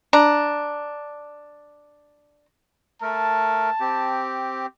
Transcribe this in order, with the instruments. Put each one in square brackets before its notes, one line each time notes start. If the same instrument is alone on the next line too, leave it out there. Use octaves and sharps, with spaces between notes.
[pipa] D4 A#5
[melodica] A3 A#4 [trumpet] A5
[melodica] C4 G4